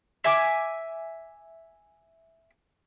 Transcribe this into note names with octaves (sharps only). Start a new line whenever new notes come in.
E5 G#5 D6